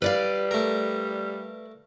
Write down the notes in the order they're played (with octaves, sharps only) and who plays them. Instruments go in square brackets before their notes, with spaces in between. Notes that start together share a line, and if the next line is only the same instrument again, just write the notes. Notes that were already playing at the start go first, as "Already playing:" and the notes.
[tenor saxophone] G3 [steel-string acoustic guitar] B4 D5 F5
[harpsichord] A3 A#4